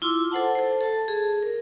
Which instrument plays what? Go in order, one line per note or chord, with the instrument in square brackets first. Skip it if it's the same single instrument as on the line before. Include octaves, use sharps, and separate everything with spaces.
[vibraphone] E4 F4 C6 D6 E6
A4 C5 F#5 A5
A4 C5
A4 A5
G#4
A#4